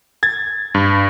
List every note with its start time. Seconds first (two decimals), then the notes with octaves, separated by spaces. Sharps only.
0.23 G#6 A6
0.75 G2